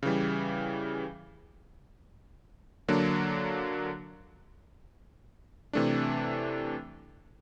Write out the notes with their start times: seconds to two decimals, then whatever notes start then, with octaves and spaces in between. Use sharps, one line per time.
0.03 C#3 E3 G3
2.88 D3 F#3 A#3 D4
5.73 C3 E3 A3 D4